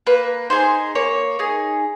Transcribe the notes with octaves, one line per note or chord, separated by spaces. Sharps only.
A#3 B4
D#4 G#4 C5
A#3 C#5
D#4 G#4